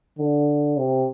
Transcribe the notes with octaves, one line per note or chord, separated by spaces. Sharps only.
D3
C3